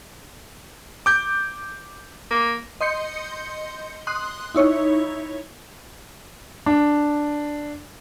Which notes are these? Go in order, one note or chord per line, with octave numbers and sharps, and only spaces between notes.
D6 G6
A#3
D#5 C6 G6 C#7
C6 D#6 F#6
D#4 E4 C#5
D4